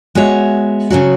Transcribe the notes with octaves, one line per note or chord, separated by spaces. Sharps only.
G#3 B3 F#4 C#5 E5
C#3 F#3 C#4 F#4